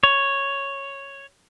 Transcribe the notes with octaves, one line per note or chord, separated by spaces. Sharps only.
C#5